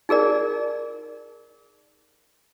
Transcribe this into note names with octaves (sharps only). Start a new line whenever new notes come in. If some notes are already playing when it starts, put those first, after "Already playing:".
D#4 G#4 A#4 D5